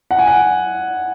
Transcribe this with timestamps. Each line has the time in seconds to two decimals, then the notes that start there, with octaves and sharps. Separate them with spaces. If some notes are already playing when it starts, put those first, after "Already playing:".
0.11 F#5
0.19 G#5
0.27 F#5